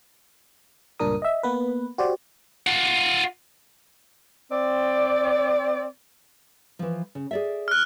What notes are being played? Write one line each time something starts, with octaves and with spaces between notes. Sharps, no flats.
C#2 G2 A#2 D4 A#4 D#6
D#5 E5
A#3 B3 B4
F#4 G4 C5 D5
F4 F#5
C4 D5
E3 F3
C#3
G#4 D5 E5
F6 F#6